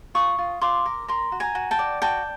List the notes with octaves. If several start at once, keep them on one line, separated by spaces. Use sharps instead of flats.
F4 C#6 D#6
F4
F4 C6 D6
A#4
A#4 A#5 C6
F#4
G#5 A#5
F#4
G5 A5
D5
F#4 G5 A5